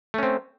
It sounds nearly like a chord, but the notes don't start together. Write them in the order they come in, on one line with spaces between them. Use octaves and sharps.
A3 C#4 C4